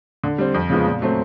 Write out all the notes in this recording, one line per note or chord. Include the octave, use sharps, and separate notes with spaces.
D3
G3 C4
F2
C#3 F3 G#3 B3
A#2
F#3 A3 C4